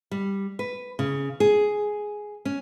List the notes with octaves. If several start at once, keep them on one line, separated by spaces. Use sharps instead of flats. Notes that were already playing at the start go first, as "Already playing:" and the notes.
G3
B4
C#3
G#4
C#4